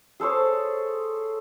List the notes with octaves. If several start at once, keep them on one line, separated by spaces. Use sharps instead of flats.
G#4 A4 C5 C#5